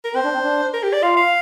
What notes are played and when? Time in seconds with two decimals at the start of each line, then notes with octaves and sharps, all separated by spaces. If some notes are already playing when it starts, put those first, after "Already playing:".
0.05 A#4
0.15 C4 C5
0.25 D4
0.34 C4
0.44 D4
0.74 A#4
0.83 G4
0.93 D5
1.02 F4 F5
1.17 F5